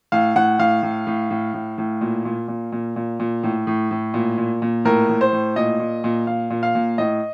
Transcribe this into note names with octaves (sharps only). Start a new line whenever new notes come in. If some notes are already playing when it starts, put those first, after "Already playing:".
A2 F5
A2 F#5
A2 F5
A2
A2
A2
A2
A2
A#2
A#2
A#2
A#2
A#2
A#2
A2
A2
A2
A#2
A#2
A#2
A2 A#4
A2
C5
A2
A#2 D#5
A#2
A#2
A#2 F5
A#2
F5
A#2
A2 D#5